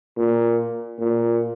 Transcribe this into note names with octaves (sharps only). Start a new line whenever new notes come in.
A#2
A#2